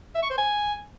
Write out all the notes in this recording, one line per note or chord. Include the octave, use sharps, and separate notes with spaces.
E5
C#6
C5
G#5